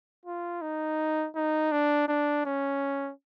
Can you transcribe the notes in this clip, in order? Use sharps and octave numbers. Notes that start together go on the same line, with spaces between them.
F4
D#4
D#4
D4
D4
C#4